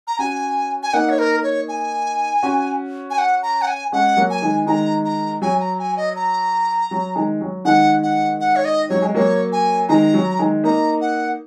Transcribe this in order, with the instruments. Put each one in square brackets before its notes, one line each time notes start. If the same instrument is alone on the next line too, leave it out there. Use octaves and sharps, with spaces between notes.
[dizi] A#5
[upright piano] C#4 F#4 [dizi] G#5
[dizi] G#5
[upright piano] A#3 D#4 [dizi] F#5
[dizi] C#5
A#4
C#5
G#5
[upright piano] C#4 F#4
[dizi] G#5
F#5
A#5
F#5
G#5
[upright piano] G#3 C#4 [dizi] F#5
[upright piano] F#3 A#3
[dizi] G#5
[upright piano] D#3 G#3
[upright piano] D#3 G#3 [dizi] A#5
[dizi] A#5
[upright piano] F#3 [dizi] G#5
[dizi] A#5
G#5
D#5
A#5
[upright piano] F#3
D#3 G#3
F#3
[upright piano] D#3 G#3 [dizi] F#5
[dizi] F#5
F#5
C#5
D#5
[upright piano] F#3 [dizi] C#5
[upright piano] G#3
[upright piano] F#3 A#3 [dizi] C#5
[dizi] G#5
[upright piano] D#3 G#3 [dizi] A#5
[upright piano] F#3
D#3 G#3
[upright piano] A#3 D#4 [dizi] A#5
[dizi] F#5